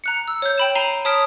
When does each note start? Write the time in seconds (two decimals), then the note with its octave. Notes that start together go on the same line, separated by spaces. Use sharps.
0.04 A#5 F#6 C#7
0.28 E6
0.42 C#5 G6
0.58 G5 B5 E7
0.75 A#5 C7 D#7 E7 G7
1.05 C#5 A5 D#6 F6 B6 D7